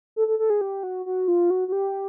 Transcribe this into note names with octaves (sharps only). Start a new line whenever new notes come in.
A4
A4
A4
G#4
G4
F#4
F#4
F4
F#4
F#4
G4